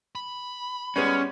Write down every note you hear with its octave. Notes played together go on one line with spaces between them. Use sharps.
B5
G3 G#3 B3 C#4